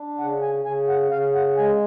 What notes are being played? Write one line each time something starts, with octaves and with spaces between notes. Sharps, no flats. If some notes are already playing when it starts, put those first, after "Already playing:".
Already playing: D4
C#3 F#5
G#5
C#3 G#5
F#5
C#3 F5
F#5
G#3 G#5